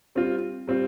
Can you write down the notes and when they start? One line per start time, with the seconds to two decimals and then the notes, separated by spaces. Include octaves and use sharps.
0.15 G3 C4 F4
0.67 G3 C4 F4